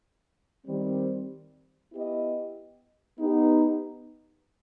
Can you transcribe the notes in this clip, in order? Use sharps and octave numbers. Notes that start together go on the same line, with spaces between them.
D#3 G3 C4
B3 E4 G4 D#5
B3 D#4 G4